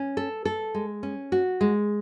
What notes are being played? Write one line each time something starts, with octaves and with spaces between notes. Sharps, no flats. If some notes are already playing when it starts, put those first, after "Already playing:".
Already playing: C#4
A4
A4
G#3
C#4
F#4
G#3